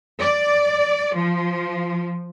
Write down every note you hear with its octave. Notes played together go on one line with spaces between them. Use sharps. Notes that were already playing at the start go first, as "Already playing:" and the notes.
D5
F3